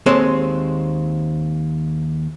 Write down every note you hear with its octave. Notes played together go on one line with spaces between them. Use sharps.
D#2 G#3 C4 A4 C#5 D#5